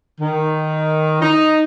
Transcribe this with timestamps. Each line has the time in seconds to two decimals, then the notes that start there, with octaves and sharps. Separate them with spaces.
0.20 D#3
1.22 D#4